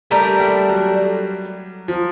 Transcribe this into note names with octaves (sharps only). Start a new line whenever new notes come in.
G3 A3 D4 G4 A#4
G3
F#3
F3